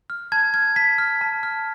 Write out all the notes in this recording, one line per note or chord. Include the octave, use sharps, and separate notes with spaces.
F6
A5 G#6
F6 G#6
A5 B6
F6
A5
F6